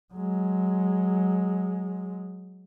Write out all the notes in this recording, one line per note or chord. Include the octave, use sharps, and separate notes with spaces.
F#3 G#3